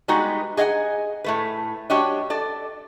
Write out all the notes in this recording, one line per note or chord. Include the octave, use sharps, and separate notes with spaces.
G3 G#3 B3 D#4 F#4
G#4 D#5 F5 F#5 G#5
A2 A3 B4
G3 D4 F#4 G4 C#5 D#5
A4 D5